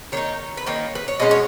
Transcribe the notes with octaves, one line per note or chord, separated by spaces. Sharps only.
D#3 A#3 D#4 C#5
B4
D#3 A#3 D#4 C#5
B4
C#5
B2 G#3 C#4 D#5
C#5